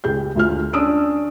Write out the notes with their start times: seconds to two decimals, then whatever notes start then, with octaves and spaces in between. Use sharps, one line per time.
0.04 C#2 G4 G#4 G6
0.36 D2 F4 F6
0.73 C#4 D4 D#6 E6 D7